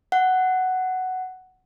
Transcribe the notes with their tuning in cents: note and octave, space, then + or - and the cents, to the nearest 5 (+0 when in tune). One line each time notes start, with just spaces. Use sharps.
F#5 +5